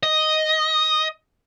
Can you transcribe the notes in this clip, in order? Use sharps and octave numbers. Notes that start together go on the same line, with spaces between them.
D#5